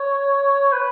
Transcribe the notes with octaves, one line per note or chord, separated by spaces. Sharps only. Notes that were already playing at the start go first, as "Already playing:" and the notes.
Already playing: C#5
B4